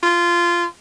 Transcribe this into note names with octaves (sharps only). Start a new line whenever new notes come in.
F4